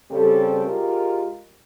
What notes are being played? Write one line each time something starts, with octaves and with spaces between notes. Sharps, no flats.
C#3 G3 C4 G4 A4
G#3 F4 G4 A#4